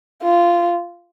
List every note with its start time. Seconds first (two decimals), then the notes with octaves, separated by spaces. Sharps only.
0.23 F4